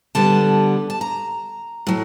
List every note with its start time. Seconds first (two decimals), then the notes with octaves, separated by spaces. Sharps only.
0.15 D3 G3 B3 A5
0.90 A5
1.01 A#5
1.87 A2 F#3